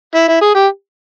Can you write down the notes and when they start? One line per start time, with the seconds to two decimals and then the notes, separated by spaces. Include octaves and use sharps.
0.14 E4
0.28 E4
0.41 G#4
0.55 G4